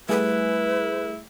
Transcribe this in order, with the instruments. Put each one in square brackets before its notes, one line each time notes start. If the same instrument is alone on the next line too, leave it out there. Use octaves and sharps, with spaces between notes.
[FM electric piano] G3 A3 G#4 [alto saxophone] E4 [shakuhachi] B4